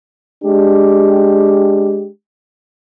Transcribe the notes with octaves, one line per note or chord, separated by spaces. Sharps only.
G#3 D4 G4